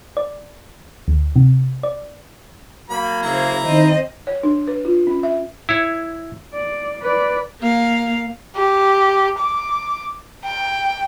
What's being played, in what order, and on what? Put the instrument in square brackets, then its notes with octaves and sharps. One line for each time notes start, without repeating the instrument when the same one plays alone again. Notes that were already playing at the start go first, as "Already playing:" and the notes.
[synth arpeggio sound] D5
D2
C3
D5
[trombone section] F#3 A#3 [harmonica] B5
[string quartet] C#3 C5 [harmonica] E4 A#5
[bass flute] D#3 [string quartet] C4 C5 D#5
[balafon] C#5
D4
B4
F4
C#4
E5
[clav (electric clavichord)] E4 C#5
[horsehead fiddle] D5
B4 D5
[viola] A#3 F5
[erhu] G4
D6
G5